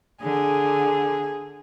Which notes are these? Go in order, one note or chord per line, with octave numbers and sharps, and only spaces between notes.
D3 G#4